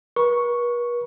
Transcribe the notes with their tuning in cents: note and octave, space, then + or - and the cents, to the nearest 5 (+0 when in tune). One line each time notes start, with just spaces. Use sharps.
B4 -45 C#6 +0